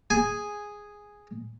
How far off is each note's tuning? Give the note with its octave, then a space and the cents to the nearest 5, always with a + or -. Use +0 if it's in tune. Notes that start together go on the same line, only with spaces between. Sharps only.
G#4 -5 G#5 +0